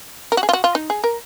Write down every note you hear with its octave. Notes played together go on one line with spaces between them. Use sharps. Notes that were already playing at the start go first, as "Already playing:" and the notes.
A#4
F#4
G#4
F4
F#4
F4
D#4
G#4
A#4